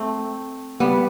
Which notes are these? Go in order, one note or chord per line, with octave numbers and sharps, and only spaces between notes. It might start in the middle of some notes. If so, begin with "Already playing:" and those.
Already playing: A3 C4
G3 B3